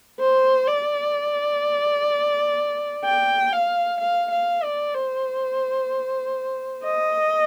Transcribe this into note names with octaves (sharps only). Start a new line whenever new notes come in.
C5
D5
G5
F5
F5
F5
D5
C5
D#5